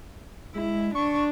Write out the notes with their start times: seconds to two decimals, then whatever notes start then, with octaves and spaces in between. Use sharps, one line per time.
0.55 G#3 E4
0.95 D4 C#6